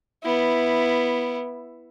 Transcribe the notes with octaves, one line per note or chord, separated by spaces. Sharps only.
B3 E4